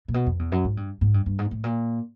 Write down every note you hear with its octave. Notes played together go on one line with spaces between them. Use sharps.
A#2
B2
F2
E2
F#2
G#2
G2
G#2
G2
G2
G#2
A2
A#2